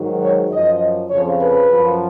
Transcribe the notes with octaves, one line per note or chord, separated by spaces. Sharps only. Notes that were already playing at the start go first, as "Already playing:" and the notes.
Already playing: G#2 D#3 F#3
C#5
F#2 F3 D#5
F2 C#3 F3 C#5
B4
F#2 F3